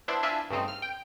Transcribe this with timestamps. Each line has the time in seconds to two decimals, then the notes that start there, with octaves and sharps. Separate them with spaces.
0.08 B3 D4 E4 C5
0.23 D4 E4 F4 E5 G#5 A5
0.50 G2 C#3 A3 C4 D#4
0.68 F6
0.82 G5